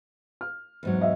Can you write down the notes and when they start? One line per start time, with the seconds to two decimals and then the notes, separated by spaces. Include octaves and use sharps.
0.41 F6
0.83 E2 G#2 F#3
1.01 D#5 E5